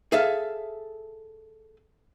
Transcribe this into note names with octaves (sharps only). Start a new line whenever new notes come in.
G#4 A4 E5 F5